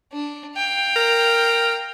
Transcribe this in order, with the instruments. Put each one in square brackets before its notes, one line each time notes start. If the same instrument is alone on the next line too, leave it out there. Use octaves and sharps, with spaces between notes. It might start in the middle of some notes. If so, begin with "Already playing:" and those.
[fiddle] D4
F5 G5
[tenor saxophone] A#4